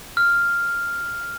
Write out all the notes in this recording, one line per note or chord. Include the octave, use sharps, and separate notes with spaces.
F6